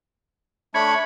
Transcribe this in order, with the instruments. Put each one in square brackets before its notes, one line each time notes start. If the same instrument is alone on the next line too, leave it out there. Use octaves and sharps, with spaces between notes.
[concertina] A3 D4 B5 [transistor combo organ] C#5